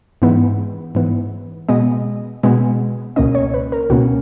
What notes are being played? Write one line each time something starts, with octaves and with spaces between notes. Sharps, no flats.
G#2 E3 B3
G#2 E3 B3
B2 G#3 B3 D#5
B2 G#3 B3
C#2 B2 A#3 C#4 D#5
C#5
B4
A#4
C#2 B2 A#3 C#4 F#4